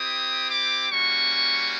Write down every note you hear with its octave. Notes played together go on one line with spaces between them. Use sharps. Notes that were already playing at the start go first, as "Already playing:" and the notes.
Already playing: C4 E4 G4 D#6
D6
G3 A#3 C#4 F#4 C#6